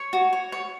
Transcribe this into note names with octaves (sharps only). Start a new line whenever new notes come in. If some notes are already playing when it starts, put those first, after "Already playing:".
Already playing: C#5 C#6
F#4
C#5
C#5